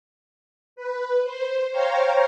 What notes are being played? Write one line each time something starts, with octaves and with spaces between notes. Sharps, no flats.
B4
C5
C5 C#5 F5 G5 A#5